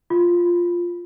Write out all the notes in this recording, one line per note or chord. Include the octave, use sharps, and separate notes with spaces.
F4